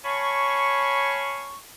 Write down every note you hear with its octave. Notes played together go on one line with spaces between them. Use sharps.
C#5 F5 G#5 A5 B5 C#6